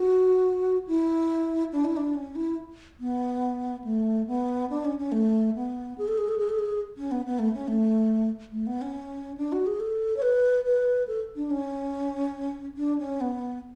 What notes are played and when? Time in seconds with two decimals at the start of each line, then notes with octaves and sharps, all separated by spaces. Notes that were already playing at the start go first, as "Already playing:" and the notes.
Already playing: F#4
0.87 E4
1.72 D4
1.85 E4
1.97 D4
2.15 C#4
2.35 E4
3.00 B3
3.84 A3
4.27 B3
4.70 D4
4.85 C#4
4.98 C#4
5.12 A3
5.55 B3
5.98 G#4
6.08 A4
6.17 G#4
6.28 A4
6.38 G#4
6.49 A4
6.59 G#4
6.97 C#4
7.11 B3
7.26 B3
7.39 A3
7.53 C#4
7.68 A3
8.52 A3
8.67 B3
8.81 C#4
9.37 D4
9.52 F#4
9.66 G#4
9.80 A4
10.17 C#5
10.22 B4
10.65 B4
11.08 A4
11.36 D4
11.51 C#4
12.77 D4
12.98 C#4
13.21 B3